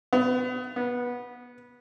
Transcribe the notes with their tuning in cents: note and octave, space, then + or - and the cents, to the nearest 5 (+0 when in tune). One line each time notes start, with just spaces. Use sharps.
B3 +30
B3 -20